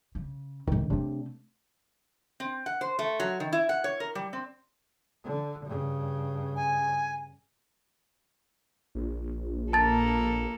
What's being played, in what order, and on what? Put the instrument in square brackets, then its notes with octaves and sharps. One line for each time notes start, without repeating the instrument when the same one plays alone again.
[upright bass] C#3
[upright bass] C#2 A2 [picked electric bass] D#3
[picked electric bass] C3 D4 [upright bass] A3 C4
[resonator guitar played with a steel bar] C4
F#5
C5
A3
F#3
D#3
E4
F#5
C#5
A#4
G3
C4
[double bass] D3
G2 C#3
[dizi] G#5
[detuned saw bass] A#1
[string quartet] A#3 A4 [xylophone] A5 A6